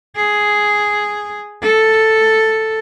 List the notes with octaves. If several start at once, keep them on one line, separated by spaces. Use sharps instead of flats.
G#4
A4